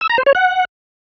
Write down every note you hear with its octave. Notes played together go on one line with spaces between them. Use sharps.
E6
A#5
C5
C#5
F#5